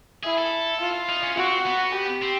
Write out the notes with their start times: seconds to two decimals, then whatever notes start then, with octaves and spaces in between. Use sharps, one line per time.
0.24 E4 G#4
0.38 A4
0.80 F4
1.09 D#4
1.23 C#4
1.37 C4 F#4
1.66 B3
1.94 G4
2.22 C4